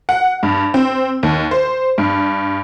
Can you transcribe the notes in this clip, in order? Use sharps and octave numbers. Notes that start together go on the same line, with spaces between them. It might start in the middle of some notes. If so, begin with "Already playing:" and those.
F#5
G2
C4
D#2
C5
G2